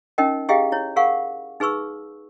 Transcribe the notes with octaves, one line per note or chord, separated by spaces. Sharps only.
C#4 D#4 A#4 D#5 G5
E4 G4 G#4 D#5 F5 G5
E4 C#5
G#4 A#4 F5 F#5 C#6
D#4 G#4 B4 C#6 E6